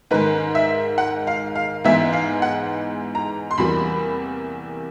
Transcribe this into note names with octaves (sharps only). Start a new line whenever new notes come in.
G#2 D#3 G#3 B4
E5
F#5
F5
F5
G#2 E3 G#3 B3 E5
F5
F#5
A#5
C6
E2 C3 E3 G3 A#3 B5